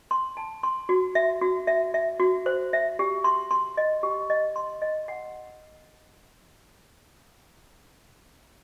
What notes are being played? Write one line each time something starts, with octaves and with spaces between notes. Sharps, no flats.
C6
A5
C6
F#4
E5
F#4
E5
E5
F#4
C5
E5
G4
C6
C6
D#5
G4
D#5
C6
D#5
F#5